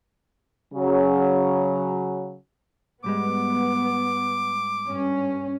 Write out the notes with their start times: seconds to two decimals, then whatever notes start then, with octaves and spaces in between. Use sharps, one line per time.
0.73 C#3 F#3
3.04 G#2 G3 G#3 B3 D6
4.91 G2 C#4